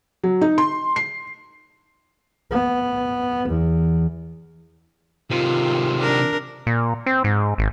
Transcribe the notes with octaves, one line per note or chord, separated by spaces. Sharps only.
F#3
D#4
C6
C7
B3
E2
C3 D#3 F4
D4 A#4
A#2
C4
G#2
G#1